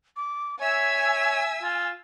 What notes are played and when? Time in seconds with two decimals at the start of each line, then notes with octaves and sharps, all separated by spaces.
0.16 D6
0.61 C#5 E5 G#5 E6
1.63 F4